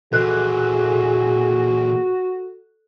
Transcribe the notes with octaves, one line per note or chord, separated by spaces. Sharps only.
A#2 E3 F#4 G#4 A4 F#6